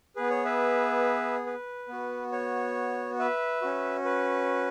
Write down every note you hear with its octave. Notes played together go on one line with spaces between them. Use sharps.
B3 G#4 B4
C#5
B4 E5
B4
B3 F#4
C#5
B4 E5
C#4 F#4
B4